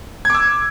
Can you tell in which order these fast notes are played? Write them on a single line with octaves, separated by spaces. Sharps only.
G#6 D6 E6